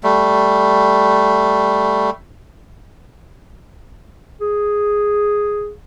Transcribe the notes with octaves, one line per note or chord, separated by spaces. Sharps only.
G3 A3
G#4